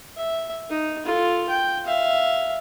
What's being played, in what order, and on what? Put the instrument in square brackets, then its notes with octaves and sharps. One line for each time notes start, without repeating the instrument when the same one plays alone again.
[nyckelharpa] E5
D#4
F4 A4
G5
E5 F5